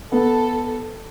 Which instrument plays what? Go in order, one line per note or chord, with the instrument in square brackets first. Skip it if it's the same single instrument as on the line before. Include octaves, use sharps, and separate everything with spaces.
[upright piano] B3 [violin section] A4